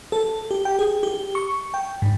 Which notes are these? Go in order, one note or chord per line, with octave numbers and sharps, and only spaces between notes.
A4
G4
G5
G#4
G4
C#6
G5
G#2